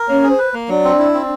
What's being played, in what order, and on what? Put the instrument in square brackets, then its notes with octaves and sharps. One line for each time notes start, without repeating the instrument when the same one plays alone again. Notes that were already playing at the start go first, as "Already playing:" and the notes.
Already playing: [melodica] A#4
[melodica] A#3 [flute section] C#4 C#5
[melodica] G#4
[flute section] C5
[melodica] B4
A#3
[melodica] F#3 [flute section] D4 D5
[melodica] C4
E4
C4